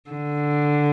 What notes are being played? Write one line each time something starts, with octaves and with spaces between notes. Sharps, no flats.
D3